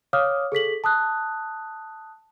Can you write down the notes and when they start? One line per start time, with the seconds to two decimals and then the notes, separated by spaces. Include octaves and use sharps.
0.13 C#5 F5 D6 D#6 F6
0.52 G#4 A4 B6 F#7
0.84 A5 D#6 F#6